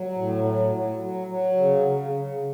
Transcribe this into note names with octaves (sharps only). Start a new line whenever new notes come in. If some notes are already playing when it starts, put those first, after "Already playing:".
Already playing: F#3
A2
F#3
F#3
F#3
F#3
C#3
C#3
C#3